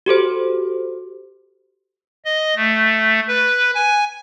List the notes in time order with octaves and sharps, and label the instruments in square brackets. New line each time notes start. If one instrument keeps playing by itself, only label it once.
[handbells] F#4 G4 A4 C5
[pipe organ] D#5
A3
B4
G#5